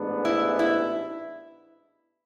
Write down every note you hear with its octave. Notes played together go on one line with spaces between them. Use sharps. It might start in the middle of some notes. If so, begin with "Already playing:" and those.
Already playing: A1 G#2 G#3 B3 D4
E4
E4